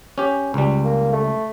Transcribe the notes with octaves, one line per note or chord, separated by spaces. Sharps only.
C#4 G4
C#2 G3
A#3
A3